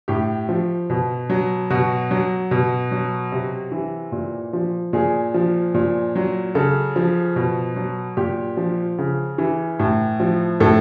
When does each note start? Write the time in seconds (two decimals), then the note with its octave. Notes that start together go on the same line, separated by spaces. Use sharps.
0.08 A2 G4
0.49 F3
0.90 B2
1.30 F#3
1.70 B2 F#4
2.11 F#3
2.51 B2
2.91 F#3
3.32 C3
3.72 E3
4.12 A#2
4.53 F3
4.93 A#2 G#4
5.34 F3
5.74 A#2
6.15 F#3
6.55 C#3 A4
6.96 F3
7.36 B2
7.76 F#3
8.17 A#2 G4
8.57 F3
8.99 C#3
9.38 E3
9.80 A2
10.20 F3
10.60 A2 A4